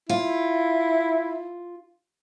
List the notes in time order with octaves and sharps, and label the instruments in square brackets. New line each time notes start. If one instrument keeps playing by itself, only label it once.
[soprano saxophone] E4 [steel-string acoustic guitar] F4